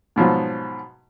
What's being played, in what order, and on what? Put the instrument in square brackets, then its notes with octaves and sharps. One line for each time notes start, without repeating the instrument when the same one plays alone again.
[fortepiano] G#2 B2 F3 F#3